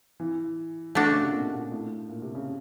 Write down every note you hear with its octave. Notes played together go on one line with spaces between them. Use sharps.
E3
D3 A3 D4 F#4
C#3
C3
A#2
B2
A#2
A2
A#2
C3
C#3